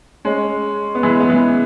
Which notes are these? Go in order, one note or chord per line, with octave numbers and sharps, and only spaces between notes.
G#3 C#4
B3
E3 G#3
B3
E3 G#3